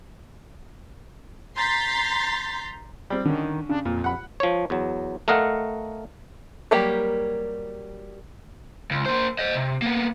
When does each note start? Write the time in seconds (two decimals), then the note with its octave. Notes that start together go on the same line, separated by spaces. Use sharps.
1.55 A#5 C6 G6 A6 B6 C7
3.10 G3 C4 G4
3.25 D3 D#3 C#4
3.69 C#3 D4
3.85 F2 A#2
4.04 F#5 B5
4.40 F3 C#5
4.70 E2 F#3
5.28 A3 A#4 D#5 F5 F#5
6.71 F#3 G3 A#3 G4
8.91 C#2
9.06 A#3 C5
9.39 C5 D#5
9.55 C3
9.82 A#3 B3